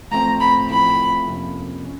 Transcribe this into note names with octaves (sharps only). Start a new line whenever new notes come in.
A1 A2 F3 A3 C4 A#5
B5
A1 A2 F3 A3 C4 B5
F2 C3 F3 A#3 C#4
C#4